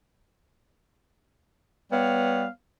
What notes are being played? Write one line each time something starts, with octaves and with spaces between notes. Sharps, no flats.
G3 B3 C#5 F5